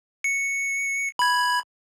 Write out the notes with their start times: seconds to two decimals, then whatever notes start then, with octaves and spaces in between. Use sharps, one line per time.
0.24 C#7
1.19 B5 G#6